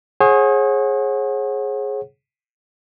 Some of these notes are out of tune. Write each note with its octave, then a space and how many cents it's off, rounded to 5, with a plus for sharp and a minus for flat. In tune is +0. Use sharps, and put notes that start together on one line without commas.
G#4 +10 C#5 -40 F#5 +0